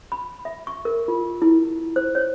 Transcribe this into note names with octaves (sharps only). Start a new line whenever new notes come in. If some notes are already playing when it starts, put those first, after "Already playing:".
B5
E5
C#6
A#4
F4
E4
C5
C#5